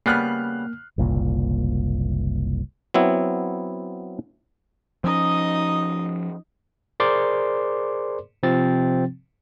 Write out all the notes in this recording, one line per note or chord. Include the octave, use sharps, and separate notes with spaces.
C#3 G3 A#3 B3 F6 F#6 C7
F#1 C2 A#2
F#3 B3 C4 E4
F3 C#4 D#4 D#5
G#4 A#4 C5 D5 C6 D6
C3 F3 C4 A6